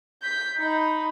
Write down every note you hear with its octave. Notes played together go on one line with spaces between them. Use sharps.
G6 B6
D#4 B5